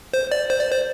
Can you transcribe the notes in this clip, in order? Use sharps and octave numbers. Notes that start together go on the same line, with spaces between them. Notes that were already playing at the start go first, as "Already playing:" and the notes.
C5
D5
C5
D5
C5